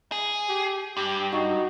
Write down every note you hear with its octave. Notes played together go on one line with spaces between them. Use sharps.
G#4
G4
G2 G4
D#4 F#4